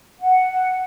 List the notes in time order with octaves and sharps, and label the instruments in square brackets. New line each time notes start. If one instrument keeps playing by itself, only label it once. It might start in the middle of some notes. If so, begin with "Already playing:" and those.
[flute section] F#5